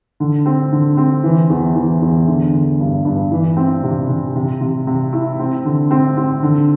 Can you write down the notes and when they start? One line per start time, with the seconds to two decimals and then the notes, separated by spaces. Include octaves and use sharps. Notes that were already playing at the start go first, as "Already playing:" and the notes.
0.20 D3
0.46 C4
0.72 D3
0.97 C4
1.23 E3
1.50 E2
1.75 E3
2.02 E2
2.27 D3
2.54 D3
2.80 G2
3.05 G2
3.31 E3
3.57 C4
3.83 C3
4.09 C3
4.35 C3
4.61 C3
4.87 C3
5.13 E4
5.39 C4
5.65 D3
5.91 C4
6.17 C4
6.43 D3